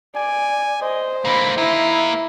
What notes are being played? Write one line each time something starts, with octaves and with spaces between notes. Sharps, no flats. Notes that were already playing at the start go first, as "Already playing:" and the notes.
D5 G#5
C5 D#5
D3 A#3 B5
A#3 D#4 E4